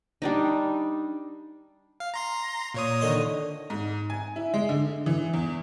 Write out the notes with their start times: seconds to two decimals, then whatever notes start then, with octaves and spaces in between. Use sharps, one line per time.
0.22 G3 D4 D#4
2.00 F5
2.14 A#5 C6 A#6
2.74 A#2 C#5 D#6
3.01 D3 D#3 D#5
3.70 G#2
4.10 G#5
4.36 E4
4.54 G#3
4.69 D3
5.06 E3
5.33 E2